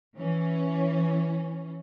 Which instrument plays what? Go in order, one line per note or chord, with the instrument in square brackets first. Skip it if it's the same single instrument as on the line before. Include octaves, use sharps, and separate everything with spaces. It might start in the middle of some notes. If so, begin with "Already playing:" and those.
[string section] E3 C#4